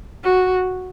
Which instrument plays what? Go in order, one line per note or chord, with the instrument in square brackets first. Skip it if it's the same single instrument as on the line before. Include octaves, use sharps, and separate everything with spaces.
[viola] F#4